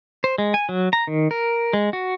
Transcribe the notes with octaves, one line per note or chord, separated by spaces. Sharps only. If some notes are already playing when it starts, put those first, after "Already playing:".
C5
G#3
G#5
F#3
A#5
D#3
A#4
G#3
F#4